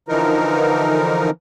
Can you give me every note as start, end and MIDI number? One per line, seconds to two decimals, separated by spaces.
0.08 1.30 50
0.08 1.30 52
0.08 1.30 53
0.08 1.30 63
0.08 1.30 70